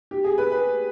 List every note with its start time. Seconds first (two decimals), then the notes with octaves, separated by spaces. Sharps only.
0.11 G4
0.24 G#4
0.38 B4
0.52 B4